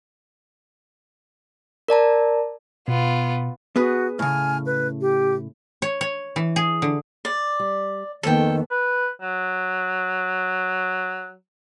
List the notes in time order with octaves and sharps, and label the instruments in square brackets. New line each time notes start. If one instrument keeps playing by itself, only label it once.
[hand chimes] A#4 D5 A5 A#5
[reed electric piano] B2 [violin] B3 F4
[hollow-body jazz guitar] B3 G#4 B4 [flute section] F#4
[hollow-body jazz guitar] A2 C#3 [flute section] G#5 F6
[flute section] B4
G4
[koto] C#5
C#5
E3
G#4
D3
[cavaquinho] D5
[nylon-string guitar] G3
[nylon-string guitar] F2 A#3 B3 [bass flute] D#3 [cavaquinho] A4 G5
[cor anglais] B4
F#3